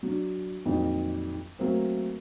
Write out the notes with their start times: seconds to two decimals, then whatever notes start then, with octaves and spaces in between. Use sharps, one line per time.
0.03 F#3 D4
0.66 A#1 F2 D#3 F3 F#3
1.59 F#3 A3 A#3 C4